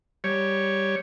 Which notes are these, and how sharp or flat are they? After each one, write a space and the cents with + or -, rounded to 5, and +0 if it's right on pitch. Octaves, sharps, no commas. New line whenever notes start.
G3 +0 C#5 +0